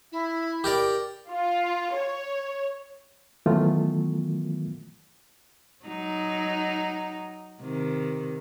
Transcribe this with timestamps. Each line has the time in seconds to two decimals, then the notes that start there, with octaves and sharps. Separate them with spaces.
0.12 E4
0.64 G4 A#4 D5
1.29 F4
1.94 C#5
3.46 D#3 E3 F#3 A3 B3 F4
5.85 F#3 D#4
7.61 C3 D#3